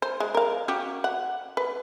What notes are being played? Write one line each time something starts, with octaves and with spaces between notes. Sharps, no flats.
C5
G#3
A#4 F5
C#4 F#4 G4
F#5
B4